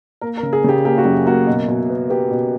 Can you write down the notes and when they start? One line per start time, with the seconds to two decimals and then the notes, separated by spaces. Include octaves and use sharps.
0.21 A#3 A#4
0.37 A#4
0.43 C#3
0.53 G#4
0.64 C#3 G4
0.85 A#3 G4
0.98 F#4
1.05 F#2
1.26 A#3 F#4
1.47 B2
1.68 B2
1.90 B3
2.09 B3 G4
2.31 B2